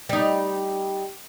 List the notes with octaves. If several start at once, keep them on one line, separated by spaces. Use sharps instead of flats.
G3 D#4